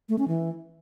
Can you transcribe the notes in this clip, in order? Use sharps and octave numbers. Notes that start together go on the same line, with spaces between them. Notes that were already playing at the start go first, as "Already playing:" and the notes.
A3
C#4
E3